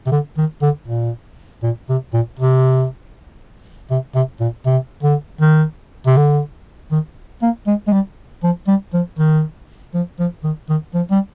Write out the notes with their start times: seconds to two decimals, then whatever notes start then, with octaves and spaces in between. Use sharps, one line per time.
0.07 C3
0.12 D3
0.38 D#3
0.62 D3
0.88 A#2
1.63 A#2
1.89 C3
2.13 A#2
2.40 C3
3.91 C3
4.15 C3
4.40 A#2
4.66 C3
5.03 D3
5.41 D#3
6.06 C3
6.17 D3
6.92 D#3
7.42 A#3
7.67 G#3
7.88 G#3
7.93 G3
8.43 F3
8.68 G3
8.94 F3
9.19 D#3
9.94 F3
10.19 F3
10.44 D#3
10.69 D#3
10.94 F3
11.11 G3